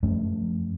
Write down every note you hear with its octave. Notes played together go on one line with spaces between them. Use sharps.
F#2 F3 A3 C#4